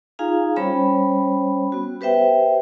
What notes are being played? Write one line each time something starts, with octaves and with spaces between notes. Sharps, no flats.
D#4 F4 G#4 F5 G#5 A#5
G3 C#4 C5 C#5 G5 B5
B3 F#4
G4 B4 C5 E5 G5